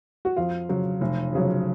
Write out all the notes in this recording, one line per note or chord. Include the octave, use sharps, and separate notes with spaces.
F#4
F2 F4
C#3 F#3
F1
F2 C#3 F#3